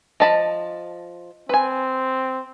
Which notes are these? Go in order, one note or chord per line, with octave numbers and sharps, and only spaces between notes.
F3 D#5 A5 B5
C4 B4 G#5